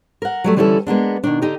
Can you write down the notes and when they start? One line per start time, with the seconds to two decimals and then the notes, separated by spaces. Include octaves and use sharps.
0.22 A#4 F#5
0.44 F#3 G3 A3
0.56 D3 E3 G3 C#4 E4 A4
0.87 G#3 A#3 B3 D4
1.24 B2 D#3 D4
1.42 D3 D#4 G4